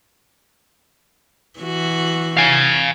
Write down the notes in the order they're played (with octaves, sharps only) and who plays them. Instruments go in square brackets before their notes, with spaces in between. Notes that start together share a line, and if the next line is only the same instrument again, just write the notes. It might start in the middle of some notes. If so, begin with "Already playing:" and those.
[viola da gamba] E3 F#4
[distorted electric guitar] F5 G#5